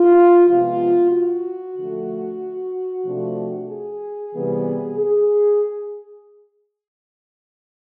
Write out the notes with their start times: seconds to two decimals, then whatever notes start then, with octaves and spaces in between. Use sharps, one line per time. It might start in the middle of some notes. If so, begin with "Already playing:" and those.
Already playing: F4
0.47 C3 F3 G#3 B3 F4
1.11 F#4
1.76 D3 F3 A3
3.04 C3 F3 A3 D4
3.68 G#4
4.32 C3 E3 G3 B3
4.96 G#4